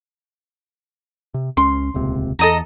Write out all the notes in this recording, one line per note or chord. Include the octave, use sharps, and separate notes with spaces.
C3
C#2 C#4 C6
D#1 C#2 C3
E2 A4 D#5 A#5